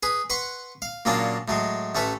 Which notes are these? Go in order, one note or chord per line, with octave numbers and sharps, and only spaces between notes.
G#4 B4
B4 F#5 C6 C#6
F5
A#2 C#3 F#3 A#3 C#4 D4
A2 F#3 G#3
A1 A3 C#4 B4